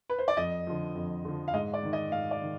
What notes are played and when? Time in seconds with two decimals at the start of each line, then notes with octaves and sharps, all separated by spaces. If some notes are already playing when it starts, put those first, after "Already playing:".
0.10 B4
0.19 C5
0.28 D5
0.37 F2 D#5
0.67 D3 F3
0.95 F2
1.25 D3 F3
1.48 F5
1.53 G#2 D#5
1.74 D5
1.83 D#3
1.93 D#5
2.12 G#2 F5
2.31 D5
2.42 D#3